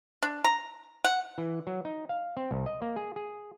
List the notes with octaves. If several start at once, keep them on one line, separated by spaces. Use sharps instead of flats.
D4
A#5
F#5
E3
F#3
D#4
F5
C4
C2
D#5
A#3
G#4
G#4